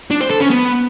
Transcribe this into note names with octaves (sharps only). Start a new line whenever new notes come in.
D4
C5
A4
C#4
B3